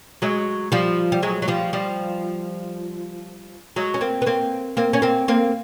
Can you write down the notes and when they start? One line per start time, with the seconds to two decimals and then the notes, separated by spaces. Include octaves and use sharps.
0.22 F#3 G#3
0.72 F3 G3
1.12 G3
1.22 F#3 G#3
1.42 F#3
1.48 F3 G3
1.73 F3 G3
3.76 F#3 G#3
3.94 C#4
4.01 A#3 C4
4.22 B3
4.26 A#3 C4
4.77 A#3 C4
4.93 C#4
5.02 A#3 C4
5.28 A#3 C4